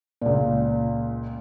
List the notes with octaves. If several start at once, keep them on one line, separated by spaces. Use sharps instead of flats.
C#2 A#2